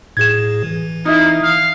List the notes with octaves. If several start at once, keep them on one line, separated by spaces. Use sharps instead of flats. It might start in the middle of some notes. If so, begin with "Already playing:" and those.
A2 G#4 G#6 E7
E3
A#3 D#4 E4
F5